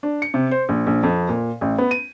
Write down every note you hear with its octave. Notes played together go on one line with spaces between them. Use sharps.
D4
C#7
C3
C5
A#1
A#1
F2
A#2
A1
B3
D#7